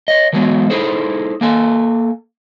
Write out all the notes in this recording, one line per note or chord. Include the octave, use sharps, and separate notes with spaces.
C#5 D#5
E3 F#3 G#3 B3
D#4 E4 G#4 A4 C5
A#3 A4 G#5